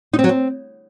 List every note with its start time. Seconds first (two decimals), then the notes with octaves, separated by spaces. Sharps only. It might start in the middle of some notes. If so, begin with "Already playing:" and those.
0.13 D#4
0.19 C4
0.24 F#3
0.29 C4